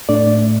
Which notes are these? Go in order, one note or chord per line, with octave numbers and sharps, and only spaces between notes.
A2 A3 D4 D5